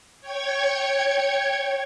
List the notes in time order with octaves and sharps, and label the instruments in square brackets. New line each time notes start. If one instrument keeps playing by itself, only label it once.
[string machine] C#5 G5 C#6 G#6